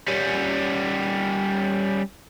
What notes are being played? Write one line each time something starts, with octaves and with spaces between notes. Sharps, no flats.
G3 C#4